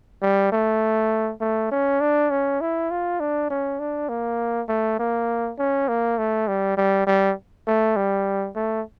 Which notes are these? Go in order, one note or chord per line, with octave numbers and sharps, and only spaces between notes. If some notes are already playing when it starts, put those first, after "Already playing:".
G3
A3
A3
C#4
D4
C#4
E4
F4
D4
C#4
D4
A#3
A3
A#3
C#4
A#3
A3
G3
G3
G3
A3
G3
A3